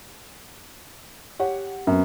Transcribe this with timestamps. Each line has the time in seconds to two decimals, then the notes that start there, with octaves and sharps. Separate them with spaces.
1.39 G4 C#5 F#5
1.87 F#2 B3 C4